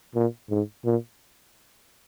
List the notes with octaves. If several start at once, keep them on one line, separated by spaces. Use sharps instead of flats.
A#2
G#2
A#2